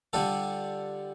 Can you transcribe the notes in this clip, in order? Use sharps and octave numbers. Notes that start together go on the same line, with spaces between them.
D3 G3 D4 F4 A4